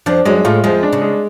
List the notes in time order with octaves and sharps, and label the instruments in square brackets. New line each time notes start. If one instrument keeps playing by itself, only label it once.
[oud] F2 F3 [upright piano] D4
[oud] F#2 F#3 [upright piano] G#3
[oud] A2 A3 [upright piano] F4
[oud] F2 F3 [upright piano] G#3
[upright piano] D4
[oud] C#3
[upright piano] G#3